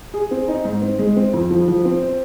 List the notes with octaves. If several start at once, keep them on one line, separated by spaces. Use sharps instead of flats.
G#4
C4
D#4
G#2
C4
G#3
C4
F2
F3
F3
C4
C5